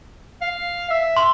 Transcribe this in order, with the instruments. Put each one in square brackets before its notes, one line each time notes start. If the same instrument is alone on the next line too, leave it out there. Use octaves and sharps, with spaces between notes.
[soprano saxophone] F5
E5
[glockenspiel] C6